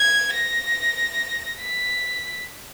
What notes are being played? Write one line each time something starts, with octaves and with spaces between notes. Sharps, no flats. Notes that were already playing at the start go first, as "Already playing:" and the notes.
Already playing: G#6
A#6
B6